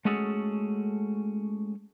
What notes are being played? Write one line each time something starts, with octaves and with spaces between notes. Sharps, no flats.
G#3 A3 C#4 F#4 G#4 A4